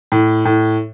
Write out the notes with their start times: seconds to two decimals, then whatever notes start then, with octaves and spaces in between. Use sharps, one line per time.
0.12 A2
0.45 A2